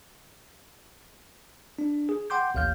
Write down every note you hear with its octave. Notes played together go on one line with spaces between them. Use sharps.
D4
G#4
F#5 G5 C6 D6 G6
A1 D#2 F5 F6 G6